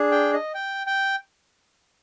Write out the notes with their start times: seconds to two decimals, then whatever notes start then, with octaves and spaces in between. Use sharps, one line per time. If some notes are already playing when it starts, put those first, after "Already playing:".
Already playing: D4 G#4
0.12 G5
0.33 D#5
0.55 G5
0.87 G5